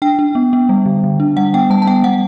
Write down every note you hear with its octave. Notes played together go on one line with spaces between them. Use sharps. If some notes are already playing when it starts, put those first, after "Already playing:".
D4 G5
D4
B3
B3
G3
D3
D3
D4
G3 F#5
B3 G5
G3 A5
A5
B3 G5
G3 F#5